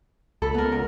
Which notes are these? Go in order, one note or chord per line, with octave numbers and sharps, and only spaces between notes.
C#2 A4 B5
B3 A#4
A#4